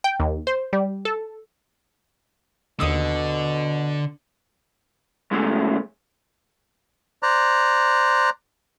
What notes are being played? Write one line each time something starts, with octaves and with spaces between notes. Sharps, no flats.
G5
D#2
C5
G3
A4
D#2 B2 D3 D#6 E6
F#2 C#3 G#3 A3
C5 D5 A#5 F#6